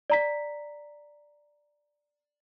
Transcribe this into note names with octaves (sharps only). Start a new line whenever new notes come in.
D5 A#5 B6